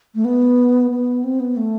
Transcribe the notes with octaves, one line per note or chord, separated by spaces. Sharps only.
A3
B3
B3
C4
B3
A3